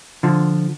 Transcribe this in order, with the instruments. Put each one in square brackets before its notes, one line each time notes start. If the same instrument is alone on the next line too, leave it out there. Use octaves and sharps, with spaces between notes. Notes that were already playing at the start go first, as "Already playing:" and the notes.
[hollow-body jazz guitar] D3 F3